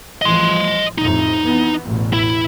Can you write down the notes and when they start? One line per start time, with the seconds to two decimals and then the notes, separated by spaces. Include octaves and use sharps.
0.22 A1 E3 F3 D#5 C6
0.98 F2 A2 C3 D#4
1.43 E3 B3
1.85 A1 E2 B2
2.13 E4